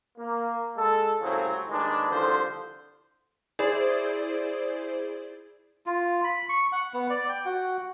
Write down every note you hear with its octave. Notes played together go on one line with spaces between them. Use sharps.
A#3
G#3 A4
C2 A2 C#3 F#3 C4
D#2 D#3 G#3 D4 B4
C2 D3 F3 A4 C5
E4 G#4 C5 D5
F4
B5
C#6
F#5
B3
D5
G5
F#4